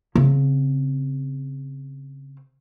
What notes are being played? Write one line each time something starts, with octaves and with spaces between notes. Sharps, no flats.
C#3 C4